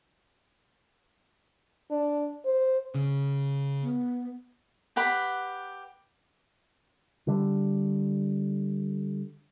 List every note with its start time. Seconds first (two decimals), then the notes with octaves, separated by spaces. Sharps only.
1.91 D4
2.45 C5
2.94 C#3
3.82 B3
4.96 G4 B4 F#5 B5
7.27 D3 G3